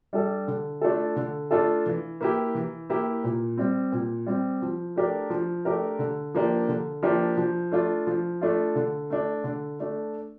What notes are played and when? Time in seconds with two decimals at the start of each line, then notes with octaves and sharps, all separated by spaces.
0.13 G3 D4 A4
0.48 D3
0.81 A3 D4 F4 A4
1.16 D3
1.51 A3 D4 F4 A4
1.86 E3
2.21 A#3 E4 G4
2.55 E3
2.90 A#3 E4 G4
3.24 A#2
3.57 G3 C4
3.92 A#2
4.26 G3 C4
4.62 F3
4.96 A3 D4 G4 A#4
5.30 F3
5.65 A3 D4 G4 A#4
5.99 D3
6.34 F3 A#3 D4 G4
6.68 D3
7.03 F3 A#3 D4 G4
7.37 F3
7.72 A3 D4 F4
8.07 F3
8.41 A3 D4 F4
8.75 D3
9.10 A3 D4
9.44 D3
9.80 A3 D4